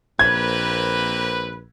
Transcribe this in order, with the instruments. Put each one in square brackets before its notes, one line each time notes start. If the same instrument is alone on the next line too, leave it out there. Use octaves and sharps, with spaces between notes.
[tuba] A#1 [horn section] A#3 C4 B4 [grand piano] G#6